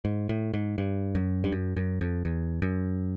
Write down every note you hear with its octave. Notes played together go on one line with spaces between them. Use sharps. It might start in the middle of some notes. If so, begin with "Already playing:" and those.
G#2
A2
G#2
G2
F#2
G2
F#2
F#2
F2
E2
F#2